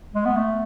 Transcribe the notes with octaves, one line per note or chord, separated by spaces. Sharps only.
G#3
B3
A3